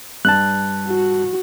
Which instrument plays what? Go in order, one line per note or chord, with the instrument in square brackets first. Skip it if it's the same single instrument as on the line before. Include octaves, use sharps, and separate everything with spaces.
[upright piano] G2 [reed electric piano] A5 F#6
[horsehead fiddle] F#4